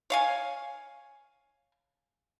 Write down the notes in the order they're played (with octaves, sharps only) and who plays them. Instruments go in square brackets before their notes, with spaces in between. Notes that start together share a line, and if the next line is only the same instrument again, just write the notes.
[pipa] C#5 F5 G#5